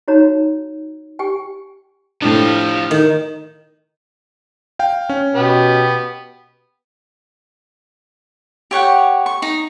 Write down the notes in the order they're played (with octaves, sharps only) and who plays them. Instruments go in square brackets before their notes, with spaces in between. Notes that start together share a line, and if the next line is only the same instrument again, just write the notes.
[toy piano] D#4 F#4 C#5 A#5
G4 G5 G#5
[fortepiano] A2 D4 [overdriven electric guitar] F3 G4
[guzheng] D#3
[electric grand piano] F5 G5
C#4
[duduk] B2 [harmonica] B3 G4
[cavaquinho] G4 C#5 F#5 G5
C#6
D#4